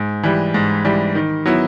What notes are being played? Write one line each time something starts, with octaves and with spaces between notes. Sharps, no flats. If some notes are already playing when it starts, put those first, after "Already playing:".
Already playing: G#2
E3 G3
G#2
E3 G3
D#3
F#3 B3 E4